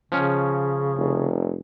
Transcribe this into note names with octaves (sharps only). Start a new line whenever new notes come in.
C#3 F3 C#4
F1